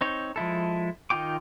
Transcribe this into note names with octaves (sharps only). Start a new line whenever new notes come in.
C4 D#4 C#5
F3 G#3 E4 A4
D#3 D#4 F4 G5 D6